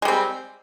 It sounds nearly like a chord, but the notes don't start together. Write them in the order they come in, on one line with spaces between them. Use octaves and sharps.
G#3 G3 C4